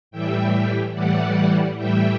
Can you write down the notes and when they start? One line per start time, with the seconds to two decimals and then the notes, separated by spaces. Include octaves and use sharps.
0.11 A2 E3 G3 E5 G5
0.93 A2 E3 G3 D5 F#5
1.76 A2 E3 G3 E5 G5